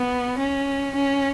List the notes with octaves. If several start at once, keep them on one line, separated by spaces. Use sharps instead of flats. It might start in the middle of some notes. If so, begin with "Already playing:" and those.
Already playing: B3
C#4
C#4